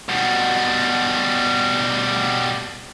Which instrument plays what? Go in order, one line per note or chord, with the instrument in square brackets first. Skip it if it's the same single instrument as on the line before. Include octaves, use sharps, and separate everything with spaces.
[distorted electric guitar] B2 G3